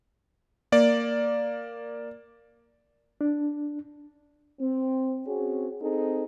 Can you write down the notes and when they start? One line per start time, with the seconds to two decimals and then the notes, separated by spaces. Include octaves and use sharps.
0.72 A#3 D5
3.21 D4
4.60 C4
5.26 C4 C#4 F#4 G#4
5.81 C4 D#4 G#4 A4